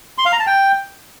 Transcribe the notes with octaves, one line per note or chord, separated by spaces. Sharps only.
C6
F5
A#5
A5
G5